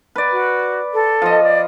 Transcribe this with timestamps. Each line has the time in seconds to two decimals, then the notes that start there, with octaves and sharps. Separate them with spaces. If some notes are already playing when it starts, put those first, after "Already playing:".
0.16 B4 D5
0.32 F#4
0.93 A4
1.22 F3 D#5
1.43 D5